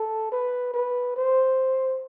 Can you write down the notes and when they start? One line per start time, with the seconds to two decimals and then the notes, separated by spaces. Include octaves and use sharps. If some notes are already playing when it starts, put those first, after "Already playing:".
Already playing: A4
0.32 B4
0.74 B4
1.17 C5